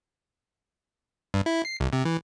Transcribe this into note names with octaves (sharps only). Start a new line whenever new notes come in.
G2
E4
C7
C2
C3
E3